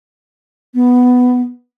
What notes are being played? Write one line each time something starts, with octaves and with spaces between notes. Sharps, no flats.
B3